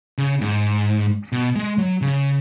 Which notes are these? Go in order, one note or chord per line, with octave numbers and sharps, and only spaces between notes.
C#3
G#2
B2
G#3
F#3
C#3